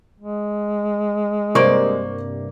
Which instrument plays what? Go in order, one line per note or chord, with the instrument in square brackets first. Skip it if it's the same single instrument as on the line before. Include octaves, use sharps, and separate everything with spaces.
[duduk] G#3
[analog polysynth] G2 C3 [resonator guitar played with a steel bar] A#3 D5 [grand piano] A#4 C5 C#6